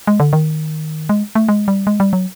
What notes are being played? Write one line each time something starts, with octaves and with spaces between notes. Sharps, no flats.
G#3
D3
D#3
G#3
A3
G#3
G3
G#3
G3
F#3